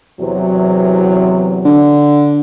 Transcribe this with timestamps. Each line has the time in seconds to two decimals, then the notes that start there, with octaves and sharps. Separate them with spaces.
0.20 E2 C3 F#3
1.65 D3